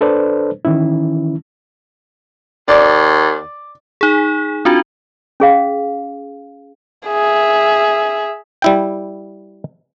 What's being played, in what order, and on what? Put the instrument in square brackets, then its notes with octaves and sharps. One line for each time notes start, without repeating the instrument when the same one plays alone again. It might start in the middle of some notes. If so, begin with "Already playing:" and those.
[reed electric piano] D4 A4 B4 C5 D5
D#3 E3 C#4 E4
[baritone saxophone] D#2 [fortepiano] D5
[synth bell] D#4 G#4
C4 D4 F4 F#4
[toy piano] C#4 G#4 F5
[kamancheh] G#4 E5
[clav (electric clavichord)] G3 E4 G5